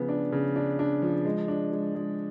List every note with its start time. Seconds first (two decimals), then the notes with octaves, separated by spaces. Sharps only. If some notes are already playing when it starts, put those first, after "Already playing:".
Already playing: C#3 F3 B3
0.09 D4
0.32 C#3
0.56 D4
0.79 D4
1.02 F3
1.25 G#3
1.48 D4
1.72 G#3
1.95 G#3